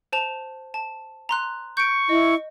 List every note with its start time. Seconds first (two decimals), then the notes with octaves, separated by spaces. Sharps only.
0.12 C5 A5 F7
0.74 A5
1.29 A#5 C6 F#6
1.77 C#6 G6 C#7 D7
2.09 E4 D#5